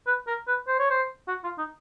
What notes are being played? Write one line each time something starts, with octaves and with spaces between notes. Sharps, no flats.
B4
A#4
B4
C5
C#5
C5
F#4
F4
D#4